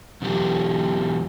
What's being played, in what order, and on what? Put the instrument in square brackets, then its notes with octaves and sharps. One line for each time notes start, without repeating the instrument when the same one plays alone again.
[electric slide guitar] E2 B2 F#3 G4